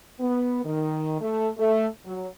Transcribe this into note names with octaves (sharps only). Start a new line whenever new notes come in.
B3
D#3
A3
A3
F#3